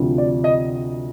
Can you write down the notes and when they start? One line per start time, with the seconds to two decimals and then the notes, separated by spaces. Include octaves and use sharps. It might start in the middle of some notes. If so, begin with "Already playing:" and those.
Already playing: D2 C3 F3
0.18 D5
0.44 D#5